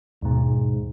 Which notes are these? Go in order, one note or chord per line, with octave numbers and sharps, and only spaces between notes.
D#2 G#2 B2